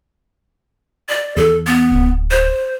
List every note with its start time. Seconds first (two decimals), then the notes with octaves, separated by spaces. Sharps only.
1.09 D5
1.36 E2 A4
1.67 B3
1.92 D1
2.31 C5